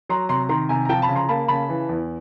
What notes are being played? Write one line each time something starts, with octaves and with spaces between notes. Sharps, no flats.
F#3 A#5 C6
C3 A#5 C6
D#3 A#5 C6
C3 G#5 A#5
A#5
F3 G5 A5
A5 B5
C#3
A#5 C6
A#3 A5 B5
C#3 A5 B5
E3
E2